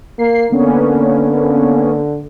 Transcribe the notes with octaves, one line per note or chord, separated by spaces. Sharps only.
A#3 C7
D3 A#3 B3 C#4